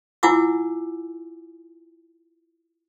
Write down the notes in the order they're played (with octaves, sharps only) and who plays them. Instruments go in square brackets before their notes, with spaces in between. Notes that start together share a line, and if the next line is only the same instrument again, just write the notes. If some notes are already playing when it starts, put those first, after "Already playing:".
[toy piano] E4 F4 F#5 G#5 D6 E6